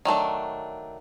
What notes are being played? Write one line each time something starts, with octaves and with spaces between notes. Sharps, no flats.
D#3 F#3 A3 D4